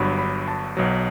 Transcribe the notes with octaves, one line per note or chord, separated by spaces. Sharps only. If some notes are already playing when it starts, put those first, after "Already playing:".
Already playing: G1 G2 F#3 B5
B5
A5
B1 B2 F#3